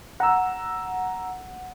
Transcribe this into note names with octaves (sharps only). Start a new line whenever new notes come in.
F#5 A#5 E6